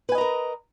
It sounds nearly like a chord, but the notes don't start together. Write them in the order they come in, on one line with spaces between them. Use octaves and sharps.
B4 G#5 D#5 A#5 A#4